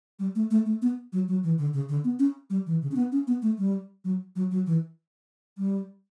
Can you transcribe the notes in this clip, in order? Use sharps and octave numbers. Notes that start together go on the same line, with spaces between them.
G3
A3
A3
A3
B3
F#3
F#3
E3
D3
C#3
D3
B3
C#4
G3
E3
C#3
C#4
B3
C#4
B3
A3
G3
F#3
F#3
F#3
E3
G3